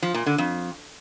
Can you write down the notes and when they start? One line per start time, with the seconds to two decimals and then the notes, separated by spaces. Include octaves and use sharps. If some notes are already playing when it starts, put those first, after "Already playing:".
0.02 F3
0.14 A#2
0.26 D3
0.38 F2